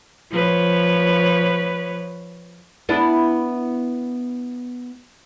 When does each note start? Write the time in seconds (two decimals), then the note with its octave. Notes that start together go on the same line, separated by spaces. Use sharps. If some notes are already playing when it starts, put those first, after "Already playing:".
0.31 F3 B4 C#5
2.89 B3 D4 E4